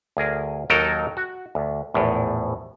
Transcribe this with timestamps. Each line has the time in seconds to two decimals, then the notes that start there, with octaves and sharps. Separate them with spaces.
0.17 D2 G#4 A#4
0.70 D#2 F#3 D#4 A4 A#4 G5
1.17 F#4
1.55 D2
1.94 A#1 E2 A2